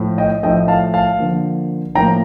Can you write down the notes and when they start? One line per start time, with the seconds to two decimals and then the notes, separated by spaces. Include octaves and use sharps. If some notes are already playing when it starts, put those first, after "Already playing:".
Already playing: A2 F3 A3
0.18 D#5 G5
0.43 A2 F3 A3 D#5 G5
0.68 F5 A5
0.94 F5 A5
1.19 D3 F3 A#3
1.95 A2 F3 A#3 G5 A#5